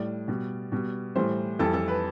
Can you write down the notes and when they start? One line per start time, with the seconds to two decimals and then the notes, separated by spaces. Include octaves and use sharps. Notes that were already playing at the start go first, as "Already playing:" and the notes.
Already playing: A2 G3 D5
0.28 B2 G3
0.72 B2 G3
1.15 A2 E3 G3 C5
1.59 F2 E3 G3 A4
1.73 A4
1.88 B4